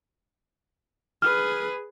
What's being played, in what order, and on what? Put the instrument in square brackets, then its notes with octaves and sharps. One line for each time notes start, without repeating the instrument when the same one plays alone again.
[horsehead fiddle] G#4 B4 [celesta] F6